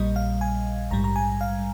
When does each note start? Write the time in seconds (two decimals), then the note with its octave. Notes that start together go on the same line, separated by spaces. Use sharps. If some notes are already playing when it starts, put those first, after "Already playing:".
Already playing: A#1 A#2 G3 D#5
0.16 F5
0.41 G#5
0.91 A#1 G#2 G3 A#5
1.04 A#5
1.16 G#5
1.41 F5